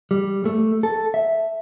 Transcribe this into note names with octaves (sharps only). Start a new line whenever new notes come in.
G3
A3
A4
E5